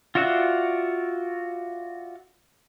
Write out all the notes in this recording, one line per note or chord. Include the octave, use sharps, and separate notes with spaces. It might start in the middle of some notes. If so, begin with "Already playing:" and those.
F4 F#4 D5 E5 F#5